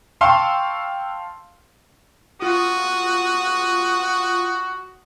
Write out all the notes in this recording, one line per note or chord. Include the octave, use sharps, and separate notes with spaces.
F5 G5 A5 C6 C#6 E6
F4 F#4 D#6